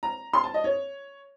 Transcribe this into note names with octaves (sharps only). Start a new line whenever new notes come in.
A#5
C6
A5
D#5
C#5